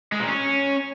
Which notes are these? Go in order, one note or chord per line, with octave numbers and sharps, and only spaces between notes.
G#3
A#2
C#4